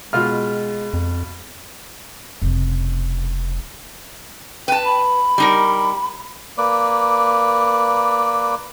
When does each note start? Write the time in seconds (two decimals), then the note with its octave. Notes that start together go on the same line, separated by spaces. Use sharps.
0.13 B2 G#3 F4 F6
0.93 F2
2.42 F1 C#3
4.68 B4 G5 A5
4.85 B5
5.38 G3 D#4 A#4
6.58 A#3 B4 D5